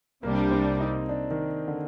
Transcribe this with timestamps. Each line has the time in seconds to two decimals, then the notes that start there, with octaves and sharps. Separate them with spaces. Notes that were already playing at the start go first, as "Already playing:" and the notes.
0.23 C2 C3 G3 A#3 D4
0.51 C4
0.80 D#4
1.09 D4
1.31 D#3
1.68 D3